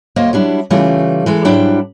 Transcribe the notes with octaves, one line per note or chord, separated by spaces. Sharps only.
D2 A#3 C5 C#5 D#5
F#3 G3 D4 E4
C#3 E3 G3 A3 F4
E3 G#3 A4
G#2 F#3 G3 D4 E4 G5